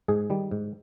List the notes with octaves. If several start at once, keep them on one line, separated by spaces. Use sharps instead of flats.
G#2 G#4
D#3 G3
G#2